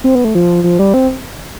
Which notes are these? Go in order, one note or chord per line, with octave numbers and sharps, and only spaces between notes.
C4
B3
A3
F3
F3
G3
C4